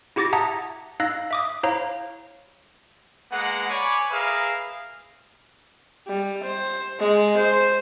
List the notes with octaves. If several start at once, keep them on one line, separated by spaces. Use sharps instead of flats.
E4 F#4 G4 D6 A6 A#6
E5 F#5 A5 A#5 D#6 G#6
D#4 F5 E6 F#6 A#6
E5 D6 D#6
E4 C5 C#5 F5 A#5
G#3 A#3 B3 F#5
C#5 D5 G#5 B5 C#6
G#4 A#4 B4 E5 F5
G3
C5
G#3
C5